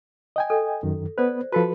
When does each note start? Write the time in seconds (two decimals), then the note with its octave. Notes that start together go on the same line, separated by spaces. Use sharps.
0.36 D#5 G5 G#5
0.50 A4
0.83 F#2 D#3
1.18 B3 B4 C5 D5
1.52 F3 F#4 A4 B4